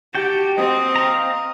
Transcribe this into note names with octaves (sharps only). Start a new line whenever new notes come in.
F#4 G4 G5 A5
C4 D#5
F5 A#5